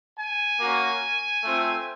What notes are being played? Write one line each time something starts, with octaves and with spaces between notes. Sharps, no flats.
G#5
A#3 C#4 F#4
A3 C4 F4